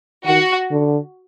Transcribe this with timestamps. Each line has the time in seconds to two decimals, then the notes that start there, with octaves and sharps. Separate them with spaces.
0.25 D#3 F#4
0.70 D3